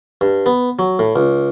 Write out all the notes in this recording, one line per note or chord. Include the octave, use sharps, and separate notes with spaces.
G2
B3
F#3
A2
C#2